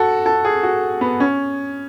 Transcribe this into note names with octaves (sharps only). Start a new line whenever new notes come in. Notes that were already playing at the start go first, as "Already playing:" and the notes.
Already playing: F#4 A4
A4
G#4
F#4
B3
C#4